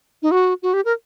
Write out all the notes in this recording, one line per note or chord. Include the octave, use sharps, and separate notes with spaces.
D#4
F#4
F#4
G4
A#4